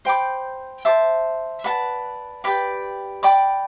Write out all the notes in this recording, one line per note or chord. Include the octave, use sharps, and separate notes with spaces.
C5 G5 B5 D6
C5 E5 A5 D6
B4 D5 F#5 A5
G4 B4 D5 G5
D5 G5 B5 D6